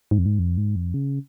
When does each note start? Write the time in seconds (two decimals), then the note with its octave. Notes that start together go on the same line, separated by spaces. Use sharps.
0.11 G#2
0.18 F2
0.26 G#2
0.39 F2
0.57 G#2
0.76 F2
0.94 C#3